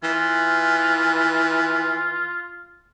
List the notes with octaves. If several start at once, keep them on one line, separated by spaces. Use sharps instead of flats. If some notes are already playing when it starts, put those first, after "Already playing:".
E3 F4